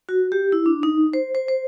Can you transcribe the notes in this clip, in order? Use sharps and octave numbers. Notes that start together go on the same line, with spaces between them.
F#4
G4
E4
D4
D#4
C5
C5
C5